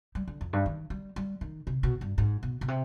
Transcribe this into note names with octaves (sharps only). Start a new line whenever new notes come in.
G3
D3
F2
G2
D#3
G3
G3
D#3
C3
B2
G2
G#2
B2
B2
C3